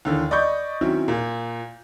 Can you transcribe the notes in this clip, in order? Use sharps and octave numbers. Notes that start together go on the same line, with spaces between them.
D#2 D3 E3
D5 D#5 B5 C#6 G6
D#3 F#3 C4 C#4 E4
A#2